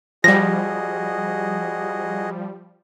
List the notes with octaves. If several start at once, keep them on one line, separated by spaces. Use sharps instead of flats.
F3 G3 F#4 G#4 D#5 A#6